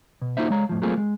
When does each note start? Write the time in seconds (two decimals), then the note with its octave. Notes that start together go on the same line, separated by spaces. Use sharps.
0.22 B2
0.37 A#3 D#4 F4 F#4 C5 E5
0.50 G#3 C#5 F5 A#5
0.69 F2 A2 F3
0.82 F#3 A3 A#3 C4 F4 G#4
0.97 G#3